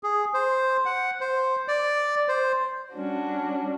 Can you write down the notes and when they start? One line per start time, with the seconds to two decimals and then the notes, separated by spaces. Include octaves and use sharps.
0.03 G#4
0.34 C5
0.86 F#5
1.21 C5
1.68 D5
2.28 C5
2.93 G3 C#4 D4 F#4